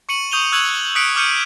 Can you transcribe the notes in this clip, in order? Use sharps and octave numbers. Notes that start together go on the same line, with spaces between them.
C#6 C#7 D#7 F#7
C#6 D#6 G6 D#7 F7 G7
C#6 E6 F#6 G#6 D#7 F#7
D#6 E6 F#6 B6 C#7 D7
D6 F6 G6 C#7 D#7